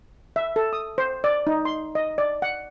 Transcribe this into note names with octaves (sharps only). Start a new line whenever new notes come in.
E5
A4
D#6
C5
D5
D#4
C6
D#5
D5
F#5